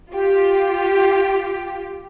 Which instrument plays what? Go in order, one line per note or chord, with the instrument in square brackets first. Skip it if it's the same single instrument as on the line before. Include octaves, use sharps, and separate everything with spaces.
[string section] F4 G4